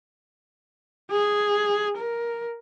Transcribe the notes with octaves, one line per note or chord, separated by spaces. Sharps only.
G#4
A#4